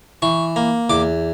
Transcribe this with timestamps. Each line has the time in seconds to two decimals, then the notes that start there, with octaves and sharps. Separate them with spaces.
0.22 E3 C#6
0.56 A#3
0.90 E2 D6